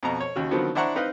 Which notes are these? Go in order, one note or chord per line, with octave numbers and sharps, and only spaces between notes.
F2 B2 A#5
C#5
D#2 C#3 F#4
D3 D#3 F3 F#3 B3 C4
D4 E4 C5 F#5 A#5 C#6
C4 D#4 B4 D#5 F5